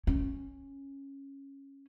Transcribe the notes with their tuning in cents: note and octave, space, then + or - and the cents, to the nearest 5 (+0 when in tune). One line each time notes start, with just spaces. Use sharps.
C#4 -10